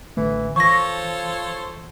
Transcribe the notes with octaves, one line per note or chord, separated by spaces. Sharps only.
A1 D3 E3 A3
E3 F3 A4 C5 C#5 C#6 A#6